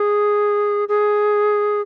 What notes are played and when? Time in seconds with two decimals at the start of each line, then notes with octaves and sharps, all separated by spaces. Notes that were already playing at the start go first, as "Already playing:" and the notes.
Already playing: G#4
0.88 G#4